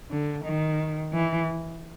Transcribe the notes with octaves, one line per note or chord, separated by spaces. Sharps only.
D3
D#3
E3